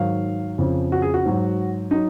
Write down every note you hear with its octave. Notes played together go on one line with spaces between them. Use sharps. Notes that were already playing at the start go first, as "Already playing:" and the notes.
Already playing: G#2 D#3 F#3 F5
F2 C#3 F3
F#4
G#4
F#4
G#2 F#3
F#3 D#4